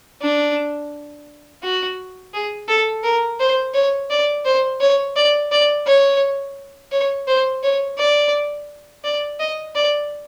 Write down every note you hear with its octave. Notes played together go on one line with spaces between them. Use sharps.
D4
F#4
G#4
A4
A#4
C5
C#5
D5
C5
C#5
D5
D5
C#5
C#5
C5
C#5
D5
D5
D#5
D5